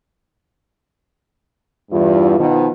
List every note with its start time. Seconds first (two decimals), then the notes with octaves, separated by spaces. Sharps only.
1.92 E2 G2 F4
2.39 B2 D#3 F3